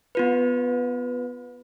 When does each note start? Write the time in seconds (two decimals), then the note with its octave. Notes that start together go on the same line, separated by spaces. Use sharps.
0.15 B3 F4 B4